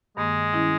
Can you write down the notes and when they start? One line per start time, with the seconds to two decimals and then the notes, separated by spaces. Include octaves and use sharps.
0.17 G2 D#3 G#3 A#3
0.53 D#3 G3 C#4 E4